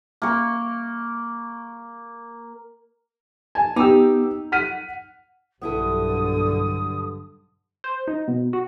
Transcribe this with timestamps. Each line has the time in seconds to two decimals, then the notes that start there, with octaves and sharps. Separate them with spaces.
0.22 A#3 C#6
3.55 G#5 A5
3.76 B3 D#4 G4 D6 E6
4.52 F#5 F6 B6 D#7
5.62 B1 G2 D3 B3 E4 A4 D#6
7.84 C5
8.08 D#4
8.28 B2
8.53 F#4